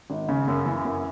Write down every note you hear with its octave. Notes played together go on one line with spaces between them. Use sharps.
G#1
C#3
F#2
E3
F#2